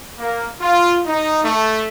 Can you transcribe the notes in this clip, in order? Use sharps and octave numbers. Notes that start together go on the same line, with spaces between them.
A#3
F4
D#4
A3